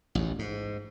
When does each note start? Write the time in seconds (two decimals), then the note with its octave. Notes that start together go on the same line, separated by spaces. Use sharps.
0.15 A1 D#2
0.39 G#2